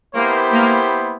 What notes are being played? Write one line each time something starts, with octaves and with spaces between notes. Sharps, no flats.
A#3 B3 E4 G4 C5
A#3